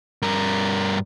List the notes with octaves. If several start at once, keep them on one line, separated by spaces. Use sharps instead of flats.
G2 A#4